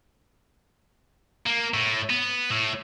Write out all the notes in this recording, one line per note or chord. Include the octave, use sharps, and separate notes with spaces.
A#3
A2
B3
A2